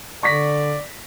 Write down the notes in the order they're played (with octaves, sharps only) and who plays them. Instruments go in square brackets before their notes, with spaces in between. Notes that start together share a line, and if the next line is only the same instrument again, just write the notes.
[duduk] D3 [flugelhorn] D5 [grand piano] C#6 A#6 B6